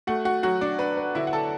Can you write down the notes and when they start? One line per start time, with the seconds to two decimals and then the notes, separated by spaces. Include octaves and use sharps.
0.07 A3 F#4 F#5
0.25 F#4 F#5
0.43 F#3 F#4 F#5
0.61 D4 D5
0.79 D4 B4
0.97 B4
1.15 D3 E4 E5
1.27 F#5
1.33 A4 A5